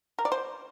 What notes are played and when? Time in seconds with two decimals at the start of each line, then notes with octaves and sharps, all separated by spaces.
0.19 A#4
0.25 D5
0.32 C5